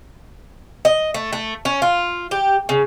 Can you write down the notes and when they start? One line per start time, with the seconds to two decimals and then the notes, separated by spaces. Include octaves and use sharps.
0.85 D#5
1.14 A3
1.33 A3
1.65 C#4
1.82 F4
2.31 G4
2.69 C#3